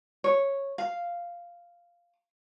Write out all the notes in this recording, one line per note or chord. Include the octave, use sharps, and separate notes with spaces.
C#5
F5